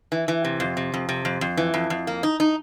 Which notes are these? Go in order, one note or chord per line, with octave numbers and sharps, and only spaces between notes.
E3
E3
C3
F2
C3
F2
C3
F2
F2
E3
F2
F2
A#3
D#4
D#4